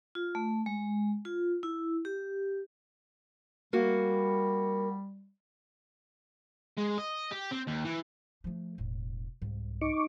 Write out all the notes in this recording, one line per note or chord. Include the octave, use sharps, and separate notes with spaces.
F4
A3
G#3
F4
E4
G4
G3 A#3 F#4
G#3
D#5
G4
C4
D#2
E3
F3 A3
E1 A2
C2 G#2
D#4 C#6 D6